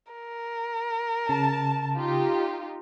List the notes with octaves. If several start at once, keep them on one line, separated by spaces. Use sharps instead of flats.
A#4
C#3 A5
D#4 F4 G4